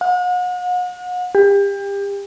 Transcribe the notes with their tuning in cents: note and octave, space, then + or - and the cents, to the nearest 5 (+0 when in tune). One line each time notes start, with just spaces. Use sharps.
F#5 -40
G4 +30